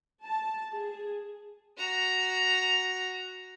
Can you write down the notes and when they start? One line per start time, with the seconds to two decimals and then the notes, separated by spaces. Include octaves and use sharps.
0.23 A5
0.74 G#4
1.78 F#4 A#5